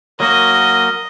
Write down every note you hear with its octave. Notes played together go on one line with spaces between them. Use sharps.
F#3 A#3 F#4 A#4 D#5